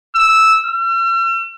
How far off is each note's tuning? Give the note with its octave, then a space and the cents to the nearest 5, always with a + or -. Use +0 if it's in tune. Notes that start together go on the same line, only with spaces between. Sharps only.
E6 -5
E6 +45